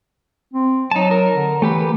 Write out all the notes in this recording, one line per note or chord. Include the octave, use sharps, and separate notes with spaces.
C4
F#3 D#4 A5
A#4
D3
E3 A3 G4 B4